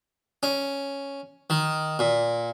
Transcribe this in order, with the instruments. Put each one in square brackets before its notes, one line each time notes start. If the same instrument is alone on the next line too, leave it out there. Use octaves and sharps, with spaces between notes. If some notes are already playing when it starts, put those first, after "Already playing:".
[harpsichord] C#4
D#3
A#2